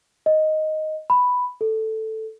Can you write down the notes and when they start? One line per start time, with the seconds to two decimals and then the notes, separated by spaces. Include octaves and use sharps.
0.26 D#5
1.10 B5
1.61 A4